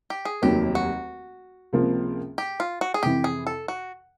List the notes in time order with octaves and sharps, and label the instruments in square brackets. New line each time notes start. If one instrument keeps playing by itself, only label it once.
[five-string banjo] G4
G#4
[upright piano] F1 D#2 D#3 F#3 A#3 [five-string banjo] G4
[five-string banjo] F#4
[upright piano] C#2 C3 F3 A#3
[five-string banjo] G4
F4
F#4
G#4
[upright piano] F2 C3 E3 [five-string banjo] G4
[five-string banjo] G#4
A4
F#4